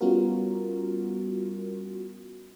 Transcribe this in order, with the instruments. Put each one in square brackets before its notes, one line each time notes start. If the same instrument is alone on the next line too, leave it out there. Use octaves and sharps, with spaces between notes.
[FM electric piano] G3 B3 C#4 F4 F#4 A#4